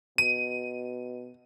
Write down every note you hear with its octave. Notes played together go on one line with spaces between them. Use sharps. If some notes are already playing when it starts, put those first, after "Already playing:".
B2 D#7